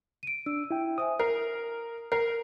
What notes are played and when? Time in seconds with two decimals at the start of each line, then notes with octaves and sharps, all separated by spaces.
0.23 D7 D#7
0.46 D4 E6
0.71 E4 G5
0.98 C5 E5 G#5 D#6
1.19 A#4 C7
2.12 A#4 C7